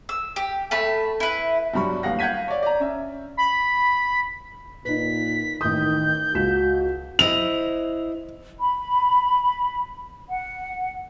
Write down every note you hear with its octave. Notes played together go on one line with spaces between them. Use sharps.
E6
G4
A3 A5 B5
E4 B4
G2 F#3 G3 B5 C#6
A1 D#2 G4 F5 F#5 A#6
F5 F#5 G6 G#6 B6 D#7
C#5 D5
D5 A#5
C#4 E5
B5
A#2 D#4 B4 B6
A1 D#3 D#6 G6
C#2 F#4 B6 E7
E4 C5 D#5 F7
B5
F#5